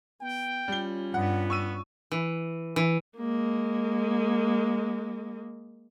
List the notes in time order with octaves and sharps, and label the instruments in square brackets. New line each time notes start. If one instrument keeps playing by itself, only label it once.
[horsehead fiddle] B3 [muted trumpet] G5
[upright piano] G3 G7 [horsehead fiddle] C#4 F4
[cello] G2 [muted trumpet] B3 [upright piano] F#5
[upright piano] C#6 E6 D#7
[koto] E3
E3
[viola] G#3 A#3